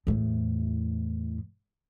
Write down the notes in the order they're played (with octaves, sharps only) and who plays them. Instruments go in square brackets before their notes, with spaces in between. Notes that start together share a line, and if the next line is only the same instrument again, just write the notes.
[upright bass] E2 A2